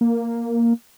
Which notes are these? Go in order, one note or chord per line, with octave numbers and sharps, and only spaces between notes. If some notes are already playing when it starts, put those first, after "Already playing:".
A#3